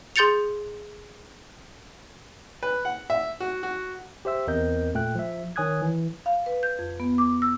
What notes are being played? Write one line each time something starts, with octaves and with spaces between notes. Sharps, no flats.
G#4 C6 G6 A6 C#7 F7
B4
F#5
E5
F#4
F#4
G4 C5 E5 E6
E2 C4 A#4 D#5 G6
A#2 A3 G5 F#6
F3 E5
D#3 C#5 G#5 D#6 F#6 G#6
E3
F5
B4
G6
F2
B3
D6
E6